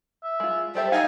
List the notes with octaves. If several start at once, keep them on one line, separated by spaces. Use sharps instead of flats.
E5
G#3 F4
G3 G4 A4 C5 E5
D#4 F5 G#5